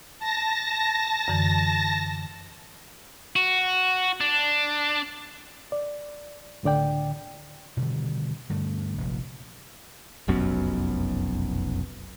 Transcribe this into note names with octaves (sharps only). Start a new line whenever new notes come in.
A5 A#6
F#2 D3 E3
F#4
D4
D5
C#2 A2 D3 D5 G5
B2 D3 D#3 G3
G2 D3 A3
F1 A#1
F1 B1 F#2 B2